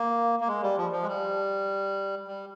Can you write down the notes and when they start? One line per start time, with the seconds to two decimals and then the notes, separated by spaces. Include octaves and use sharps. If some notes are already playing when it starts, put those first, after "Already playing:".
Already playing: A#3
0.41 A#3
0.48 G#3
0.63 G3
0.78 F3
0.92 F3
1.02 G#3
1.07 G3
2.27 G3